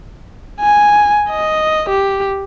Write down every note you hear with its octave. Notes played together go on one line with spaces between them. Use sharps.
G#5
D#5
G4